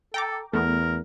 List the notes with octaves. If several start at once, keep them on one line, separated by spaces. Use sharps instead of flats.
A4 G5 A#5 D6
E2 A3 B3 A#4